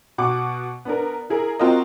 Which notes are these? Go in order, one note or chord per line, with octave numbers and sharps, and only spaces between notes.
B2 F#5 D6
B3 D4 A#4
E4 G#4 A#4
C4 F4 F#4 A#4 D#5